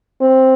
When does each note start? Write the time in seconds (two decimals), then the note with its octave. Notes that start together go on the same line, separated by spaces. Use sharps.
0.21 C4